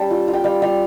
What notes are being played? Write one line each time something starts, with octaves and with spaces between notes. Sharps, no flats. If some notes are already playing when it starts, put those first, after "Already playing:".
Already playing: G3 C#4 G5 A5
F4
F4
G5
G3 F5
G3 F5